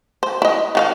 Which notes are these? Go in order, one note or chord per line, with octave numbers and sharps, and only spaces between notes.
C5
E4 D#5
D#3 F#4 F5